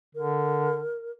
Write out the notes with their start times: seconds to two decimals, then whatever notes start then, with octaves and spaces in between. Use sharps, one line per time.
0.15 D3 A#4